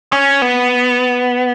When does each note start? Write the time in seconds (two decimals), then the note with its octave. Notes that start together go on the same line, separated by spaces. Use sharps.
0.12 C#4
0.42 B3